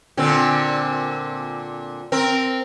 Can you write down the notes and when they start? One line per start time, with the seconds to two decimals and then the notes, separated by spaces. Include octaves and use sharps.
0.17 A#2 D3 C4
2.12 C4 A#4